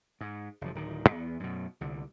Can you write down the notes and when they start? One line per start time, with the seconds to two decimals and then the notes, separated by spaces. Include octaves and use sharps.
0.21 G#2
0.61 F#1 F3
0.75 D1 D#3
1.10 E2 B3
1.40 F#2 B2
1.81 C2 D3